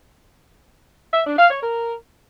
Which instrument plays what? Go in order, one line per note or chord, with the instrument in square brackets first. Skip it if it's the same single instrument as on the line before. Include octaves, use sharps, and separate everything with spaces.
[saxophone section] E5
D4
F5
C#5
A#4